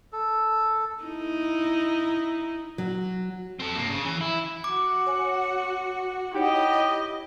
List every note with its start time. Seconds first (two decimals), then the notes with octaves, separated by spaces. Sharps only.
0.13 A4
1.03 D#4 E4
2.78 F#3
3.60 C4 A4
3.77 G2 A#3
3.91 C#3
4.05 E3 G#5
4.21 E4
4.64 F#4 F#5 D6
5.07 C#5 G#5
6.35 D#4 E4 G4 C#5 D#5 F#5